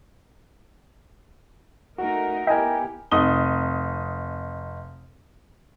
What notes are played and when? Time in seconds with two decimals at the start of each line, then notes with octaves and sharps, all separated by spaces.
1.98 A3 D#4 F#4 A#4
2.47 B3 E4 G4 A#4 D#5 G5 G#5
3.11 F1 D#4 D#6 G7